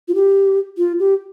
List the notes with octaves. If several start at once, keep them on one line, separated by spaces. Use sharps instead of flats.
F4
G4
F4
G4